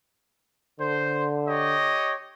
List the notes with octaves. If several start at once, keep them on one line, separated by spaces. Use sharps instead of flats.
D3 C5
G4 C#5 D#5